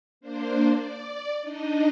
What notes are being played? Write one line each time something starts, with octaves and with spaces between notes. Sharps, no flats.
A#3 D4 C5
D5
D4 D#4 D#5